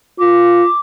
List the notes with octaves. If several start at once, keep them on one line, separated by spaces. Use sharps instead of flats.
F4 D6